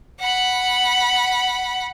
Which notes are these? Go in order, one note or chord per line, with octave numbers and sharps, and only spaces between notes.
F#5 B5